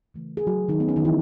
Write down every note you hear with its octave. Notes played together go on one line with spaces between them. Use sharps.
C#3 E3 A3
G#4
F#3 F#4
D#3 D#4
D#3 A3 B3
C#4
D#3 D#4
E3 E4